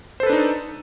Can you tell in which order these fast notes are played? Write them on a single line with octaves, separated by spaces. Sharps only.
C5 A4 B4 D4 D#4